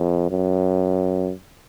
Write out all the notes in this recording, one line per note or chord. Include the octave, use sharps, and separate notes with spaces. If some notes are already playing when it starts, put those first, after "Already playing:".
Already playing: F2
F#2